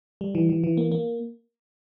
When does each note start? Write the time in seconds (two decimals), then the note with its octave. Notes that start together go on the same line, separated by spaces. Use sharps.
0.21 G3
0.35 E3
0.49 E3
0.64 E3
0.77 A#3
0.92 A#3